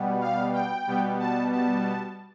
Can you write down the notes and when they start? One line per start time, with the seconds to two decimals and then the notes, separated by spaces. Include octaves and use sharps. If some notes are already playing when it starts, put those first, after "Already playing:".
Already playing: B2 G3 B3
0.21 F5
0.53 G5
0.87 B2 G3 B3
1.20 A5
1.53 A5